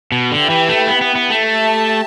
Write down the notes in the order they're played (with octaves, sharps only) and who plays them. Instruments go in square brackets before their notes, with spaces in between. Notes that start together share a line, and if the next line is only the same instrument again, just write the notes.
[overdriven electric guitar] B2
[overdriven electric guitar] D3 [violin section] E4 G4 B4 G5
[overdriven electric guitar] E3
A3
B3
B3
B3
A3
[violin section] G4 E5 A5